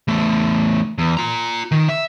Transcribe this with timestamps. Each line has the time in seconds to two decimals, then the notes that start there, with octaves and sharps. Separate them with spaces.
0.08 E2 A3
0.98 E2
1.17 F4 A#5
1.72 D#3
1.89 E5